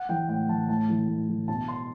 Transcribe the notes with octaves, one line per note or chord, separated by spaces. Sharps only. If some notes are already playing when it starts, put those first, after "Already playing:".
Already playing: F#5
E3 G5
A2 G5
E3 A5
A2 A5
E3
A2
E3
B2 A5
C6